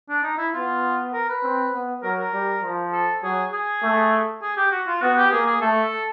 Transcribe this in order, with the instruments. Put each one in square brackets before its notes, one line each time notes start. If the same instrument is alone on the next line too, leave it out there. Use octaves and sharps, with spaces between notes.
[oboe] D4
D#4
E4
[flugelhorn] B3 [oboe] F4
[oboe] A#4
B4
[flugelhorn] C4
B3
[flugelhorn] F#3 [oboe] A#4
[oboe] A#4
[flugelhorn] G3
F3
[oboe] A4
[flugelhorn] F#3 [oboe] G#4
[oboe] G#4
[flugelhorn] A3
[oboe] G#4
G4
F#4
F4
[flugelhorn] B3 [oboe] F#4
[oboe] G4
[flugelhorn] A#3 [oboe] G#4
[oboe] G#4
[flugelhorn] A3 [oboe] A4